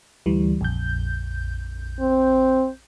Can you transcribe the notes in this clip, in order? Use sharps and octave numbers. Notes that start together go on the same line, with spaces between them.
D2 E3 G3
A#1 F2 G6
C4